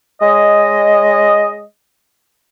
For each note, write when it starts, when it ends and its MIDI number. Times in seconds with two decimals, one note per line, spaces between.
0.21 1.63 56
0.21 1.63 73
0.21 1.63 75